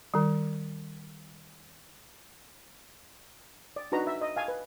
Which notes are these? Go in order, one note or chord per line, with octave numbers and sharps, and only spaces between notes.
D#3 G3
D5
D4 D#4 F#4 B4 A#5
E5
D#5
F5 G#5 A5
B4